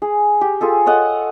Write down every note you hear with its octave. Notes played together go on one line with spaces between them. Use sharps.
G#4
G4
F4 G#4 A4
A4 C#5 D#5 F#5